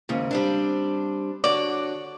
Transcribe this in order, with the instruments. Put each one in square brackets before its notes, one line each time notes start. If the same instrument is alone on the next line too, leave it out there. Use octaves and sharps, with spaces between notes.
[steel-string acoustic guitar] D#2 G#2 C#3
G3 C4 D4
[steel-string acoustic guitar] D3 F#4 C#5 [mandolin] D5